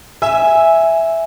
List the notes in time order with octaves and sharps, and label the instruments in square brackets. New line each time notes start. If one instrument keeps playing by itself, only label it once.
[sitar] E5 [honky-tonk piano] G#5